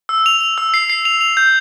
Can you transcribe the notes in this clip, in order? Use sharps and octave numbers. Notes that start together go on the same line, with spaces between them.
E6
F7
F7
E6
C7
C7
F7
F7
G6